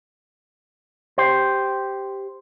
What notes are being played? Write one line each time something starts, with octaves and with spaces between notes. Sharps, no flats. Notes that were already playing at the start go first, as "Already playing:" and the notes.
G4 C5